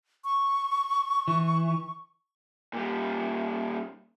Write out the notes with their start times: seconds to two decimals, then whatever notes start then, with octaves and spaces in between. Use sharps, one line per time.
0.24 C#6
1.28 E3
2.73 A#2 G3